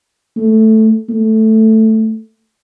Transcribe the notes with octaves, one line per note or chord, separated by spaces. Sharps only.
A3
A3